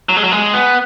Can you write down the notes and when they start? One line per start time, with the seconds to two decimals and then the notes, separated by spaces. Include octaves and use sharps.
0.09 F#3
0.17 G#3
0.24 F#3
0.32 G#3
0.54 B3